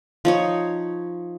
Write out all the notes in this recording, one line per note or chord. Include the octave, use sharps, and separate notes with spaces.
F3 D#4 C#5